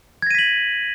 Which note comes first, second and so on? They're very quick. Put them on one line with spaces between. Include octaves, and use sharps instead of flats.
G#6 A#6 D#7 B6 F#7